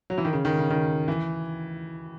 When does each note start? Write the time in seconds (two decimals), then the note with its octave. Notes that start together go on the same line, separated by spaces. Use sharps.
0.10 F#3
0.18 E3
0.25 D#3
0.33 C#3
0.45 D#3
0.58 C#3
0.70 D#3
1.08 E3